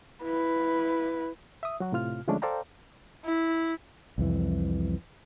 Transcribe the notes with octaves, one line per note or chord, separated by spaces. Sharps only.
E4 B4
E5 D#6
F#3 F#4
A2 C3 F4 F6
D3 F3 G#3 A3 C#4 D4
A4 C5 D5 F5 G5 A#5
E4
C2 F2 E3